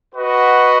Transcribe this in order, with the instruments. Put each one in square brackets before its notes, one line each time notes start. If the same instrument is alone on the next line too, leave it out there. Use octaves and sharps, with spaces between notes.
[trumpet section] F#4 B4 D#5 F#5